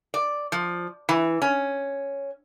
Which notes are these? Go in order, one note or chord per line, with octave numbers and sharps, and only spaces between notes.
D5
F3
E3
C#4